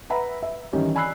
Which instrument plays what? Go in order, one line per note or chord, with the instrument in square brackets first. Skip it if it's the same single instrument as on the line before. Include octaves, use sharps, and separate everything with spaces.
[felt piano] B4 E5 F#5 A#5 B5
E5
D#3 E3 G3 C#4 G4 C#5
D5 G#5 B5 E6 F#6 C7